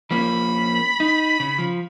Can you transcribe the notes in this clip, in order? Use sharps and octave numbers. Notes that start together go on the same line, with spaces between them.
F3 A#3 C#4 B5
D#4
C#3
F3